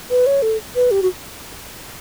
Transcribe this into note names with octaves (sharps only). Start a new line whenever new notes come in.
B4
C#5
A4
B4
G4
F#4